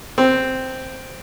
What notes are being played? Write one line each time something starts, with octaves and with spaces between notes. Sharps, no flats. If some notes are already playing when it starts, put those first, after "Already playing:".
C4